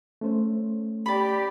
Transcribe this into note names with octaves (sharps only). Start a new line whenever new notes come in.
A3 C#4 C5
G4 D5 B5